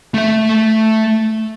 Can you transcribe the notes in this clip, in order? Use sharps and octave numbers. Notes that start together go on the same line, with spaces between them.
A3 E5